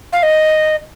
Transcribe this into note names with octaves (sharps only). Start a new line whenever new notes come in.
F5
D#5